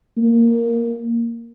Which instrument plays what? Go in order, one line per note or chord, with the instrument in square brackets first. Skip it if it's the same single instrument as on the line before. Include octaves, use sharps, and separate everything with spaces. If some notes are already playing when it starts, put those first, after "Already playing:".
[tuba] A#3